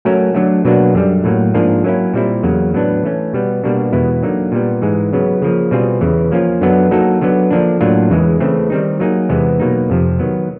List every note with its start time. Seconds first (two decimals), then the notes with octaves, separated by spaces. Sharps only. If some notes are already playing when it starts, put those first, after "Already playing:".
0.05 F#3 A3 C#4 F#4 A#4
0.34 D3 F#3 A3
0.65 B2 F#3 A#3 D4 F#4
0.95 F#2 D3 G3
1.24 A2 F#3 A#3
1.54 G#2 F3 A#3 D4 F4
1.84 F#3 A#3 C#4 E4
2.14 A#2 G3 C4 E4
2.43 E2 C#3 F#3 A#3
2.74 A2 F#3 B3 D4
3.04 E3 A3 C#4
3.33 B2 G3 B3
3.64 B2 G3 A#3 D4 F#4
3.93 E2 B2 G#3 B3 E4
4.23 D3 F#3 A#3 D#4
4.52 A#2 G3 B3
4.82 G#2 E3 G#3
5.13 C#3 F#3 B3
5.42 C#3 F3 A#3
5.71 B2 G3 C4 F4 G#4
6.01 E2 C#3 E3
6.32 F3 A#3 C#4 F4
6.61 F#2 D3 F#3 B3 D4
6.91 F#3 A#3 D#4 F#4 A4
7.22 D3 F#3 B3
7.51 D3 F3 A#3 D4
7.81 A2 F#3 A#3 D4 F4
8.10 E2 C#3 E3 G#3
8.40 C#3 E3 A3 C4
8.70 D#3 G3 C4 D#4
9.00 F#3 A#3 D#4 G#4
9.29 E2 C3 E3 G#3 B3
9.60 B2 F#3 A#3 D#4
9.90 F2 C3 F3
10.19 D#3 F#3 B3